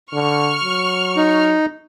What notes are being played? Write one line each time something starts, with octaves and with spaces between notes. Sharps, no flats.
D3 C#6 F6
F#3
D#4